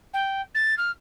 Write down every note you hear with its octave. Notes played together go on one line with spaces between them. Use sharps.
G5
A6
F6